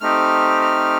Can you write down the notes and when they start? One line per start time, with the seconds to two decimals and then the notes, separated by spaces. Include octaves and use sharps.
0.01 A3 C4 D#4 G4 F6
0.62 F6